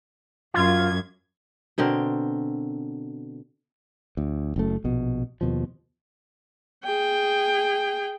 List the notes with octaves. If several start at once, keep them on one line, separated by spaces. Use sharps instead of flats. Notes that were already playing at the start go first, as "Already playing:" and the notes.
F#2 F4 G#6
B2 D3 C4 A#4
D2
F#1 F#2 A3
A#1 B2
D#2 B2 F3
G#4 G5